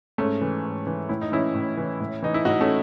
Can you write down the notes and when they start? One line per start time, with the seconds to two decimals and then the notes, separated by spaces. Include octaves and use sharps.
0.18 G#2 A3 C#4
0.41 E3
0.64 G#2
0.87 E3
1.09 A2 E4
1.21 D#4
1.32 E3 C#4 E4
1.54 A2
1.77 E3
2.00 A2
2.22 E3 D#4
2.34 E4
2.45 A2 D#4 F#4
2.60 A3 C#4